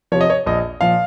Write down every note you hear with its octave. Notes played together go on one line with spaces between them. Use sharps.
C3 F3 C#5
D#5
C#5
A#1 D#5
A#2 F3 F5